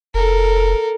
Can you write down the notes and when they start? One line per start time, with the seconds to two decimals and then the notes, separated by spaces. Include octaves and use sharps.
0.14 F1 A4 A#4